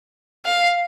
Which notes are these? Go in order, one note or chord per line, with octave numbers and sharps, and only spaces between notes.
F5